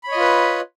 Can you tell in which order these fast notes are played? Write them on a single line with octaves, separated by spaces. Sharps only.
B5 C#5 D#5 F4 B4